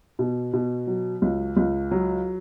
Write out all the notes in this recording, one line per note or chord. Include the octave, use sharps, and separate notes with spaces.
B2
B2
F#3
C#2
C#2
F#3